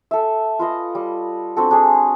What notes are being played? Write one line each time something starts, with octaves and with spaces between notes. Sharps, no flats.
A4 E5
F4 B4 D#5 F5
G3
C4 D4 F#4 A4
D4 G#4